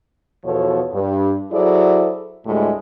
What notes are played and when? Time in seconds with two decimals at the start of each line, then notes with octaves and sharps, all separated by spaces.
0.44 E2 B2 F3 A4 C#5
0.93 G2
1.52 F#3 E4 G#4 A4 C5 D5
2.46 D2 A2 G3 G#3